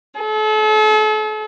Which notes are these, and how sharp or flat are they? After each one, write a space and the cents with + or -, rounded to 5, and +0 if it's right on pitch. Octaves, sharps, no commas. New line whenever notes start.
A4 -40